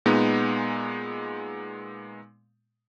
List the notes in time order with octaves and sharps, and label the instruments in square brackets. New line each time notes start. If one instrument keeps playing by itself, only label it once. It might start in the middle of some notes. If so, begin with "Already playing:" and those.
[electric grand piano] A#2 G#3 B3 D#4